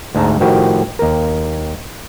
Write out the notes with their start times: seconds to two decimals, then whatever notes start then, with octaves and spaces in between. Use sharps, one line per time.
0.15 D2 G#2 A5 A#5
0.40 A2 D#3 F3 F#4 G4
0.99 D#2 A#4